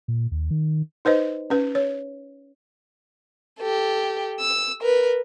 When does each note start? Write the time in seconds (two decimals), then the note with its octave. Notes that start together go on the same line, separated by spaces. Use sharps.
0.08 A#2
0.31 D#2
0.51 D#3
1.05 D#4 B4 C5 D#5
1.50 C#4 B4
1.75 C#5
3.60 G4 A4
4.40 E6
4.81 A#4 B4